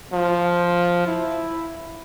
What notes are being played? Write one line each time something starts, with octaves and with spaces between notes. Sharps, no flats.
F3
E4